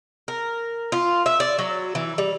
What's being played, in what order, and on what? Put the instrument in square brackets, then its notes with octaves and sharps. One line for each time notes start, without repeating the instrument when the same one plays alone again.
[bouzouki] A#4
F4
E5
D5
F#3
E3
G3